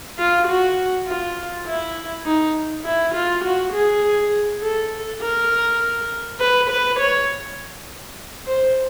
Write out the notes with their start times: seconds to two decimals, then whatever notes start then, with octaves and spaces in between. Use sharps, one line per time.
0.18 F4
0.47 F#4
1.07 F4
1.66 E4
2.25 D#4
2.84 E4
3.14 F4
3.44 F#4
3.73 G#4
4.62 A4
5.22 A#4
6.40 B4
6.70 B4
6.99 C#5
8.47 C5